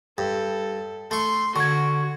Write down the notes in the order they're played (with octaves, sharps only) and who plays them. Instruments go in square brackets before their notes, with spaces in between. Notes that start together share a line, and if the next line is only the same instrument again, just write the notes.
[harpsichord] G2 [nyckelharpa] A4
[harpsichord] A3 C#6 [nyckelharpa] C6
[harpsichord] D3 [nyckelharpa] F#4 [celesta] C#6 G#6